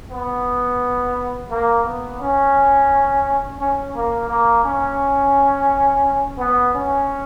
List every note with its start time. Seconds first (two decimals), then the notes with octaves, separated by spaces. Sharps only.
0.10 B3
1.50 A#3
1.85 B3
2.19 C#4
3.59 C#4
3.94 A#3
4.28 A#3
4.63 C#4
6.38 B3
6.74 C#4